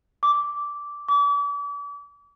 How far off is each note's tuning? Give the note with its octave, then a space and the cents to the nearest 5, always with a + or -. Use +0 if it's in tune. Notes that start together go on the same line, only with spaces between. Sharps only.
D6 -10
D6 -40